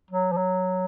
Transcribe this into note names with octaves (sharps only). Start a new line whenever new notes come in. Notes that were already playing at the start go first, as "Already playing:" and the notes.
F#3
F3
F#3